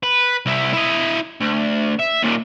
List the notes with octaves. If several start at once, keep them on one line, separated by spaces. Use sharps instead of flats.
B4
C2 E4
E4 D#5
D2
E5
D#2 A#2